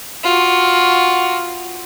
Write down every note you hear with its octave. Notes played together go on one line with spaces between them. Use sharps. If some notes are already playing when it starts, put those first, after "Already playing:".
F4 F#4